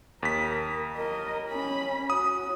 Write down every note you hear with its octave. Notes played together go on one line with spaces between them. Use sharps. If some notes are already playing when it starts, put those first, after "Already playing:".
D#2 A#4 B6
A#4 D#5
C#4 B5
F#4 C#5 D#6